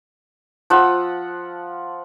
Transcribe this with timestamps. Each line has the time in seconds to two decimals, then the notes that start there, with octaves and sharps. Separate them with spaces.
0.70 F3 F4 F#5 E6